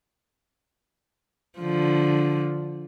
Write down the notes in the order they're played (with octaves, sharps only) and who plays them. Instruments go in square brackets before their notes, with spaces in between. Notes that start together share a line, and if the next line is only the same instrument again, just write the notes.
[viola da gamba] D3 F3